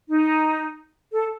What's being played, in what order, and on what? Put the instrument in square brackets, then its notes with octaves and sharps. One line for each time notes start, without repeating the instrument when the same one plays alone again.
[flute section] D#4
A4